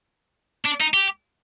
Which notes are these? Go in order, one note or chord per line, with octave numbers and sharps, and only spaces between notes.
D4
D#4
G4